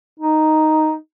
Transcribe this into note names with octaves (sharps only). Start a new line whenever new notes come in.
D#4